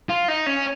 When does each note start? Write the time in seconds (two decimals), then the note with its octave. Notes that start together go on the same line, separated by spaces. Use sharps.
0.09 F4
0.28 D#4
0.46 C#4